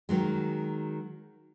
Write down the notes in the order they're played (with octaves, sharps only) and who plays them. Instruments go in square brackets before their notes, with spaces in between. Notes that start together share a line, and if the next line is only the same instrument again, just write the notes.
[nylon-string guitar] D#3 F#3 G#3